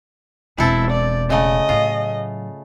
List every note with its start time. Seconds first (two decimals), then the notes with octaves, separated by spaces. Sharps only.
0.58 E1 B2 C4 E4 A4
0.91 D5
1.30 C#3 A3 D#5
1.69 A2 F#3 F4